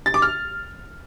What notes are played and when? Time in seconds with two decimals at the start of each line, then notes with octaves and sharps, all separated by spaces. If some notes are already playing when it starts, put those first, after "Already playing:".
0.06 A6
0.14 D6
0.22 F6